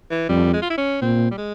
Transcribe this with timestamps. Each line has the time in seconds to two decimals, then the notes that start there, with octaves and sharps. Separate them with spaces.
0.11 E3
0.29 F2 G3
0.53 G#3
0.62 F4
0.70 E4
0.78 C#4
1.01 A#2 C4
1.31 G3
1.38 G#3